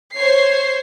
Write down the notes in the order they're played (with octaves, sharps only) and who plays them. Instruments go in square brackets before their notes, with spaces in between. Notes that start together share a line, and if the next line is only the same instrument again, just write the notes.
[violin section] C5 C#5 C7